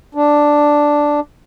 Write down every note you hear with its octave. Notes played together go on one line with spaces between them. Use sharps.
D4